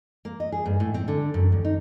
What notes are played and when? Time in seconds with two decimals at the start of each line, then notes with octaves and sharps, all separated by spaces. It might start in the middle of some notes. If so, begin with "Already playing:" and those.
0.25 A#3
0.40 D#5
0.52 G#4
0.66 G2
0.80 A2
0.94 C4
1.08 D3
1.34 F#2
1.52 D#2
1.65 D#4